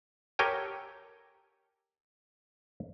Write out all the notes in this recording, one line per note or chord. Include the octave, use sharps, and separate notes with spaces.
G4 A4 A#4 C#5 G5 G#5